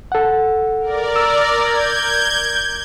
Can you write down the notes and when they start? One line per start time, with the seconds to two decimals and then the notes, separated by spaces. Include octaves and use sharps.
0.12 A4 F#5
0.81 A#4 D5
1.16 E6
1.56 G6 G#6